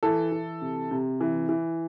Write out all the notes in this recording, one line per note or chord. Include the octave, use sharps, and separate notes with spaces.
E3 A4
E3
C3
C3
E3
E3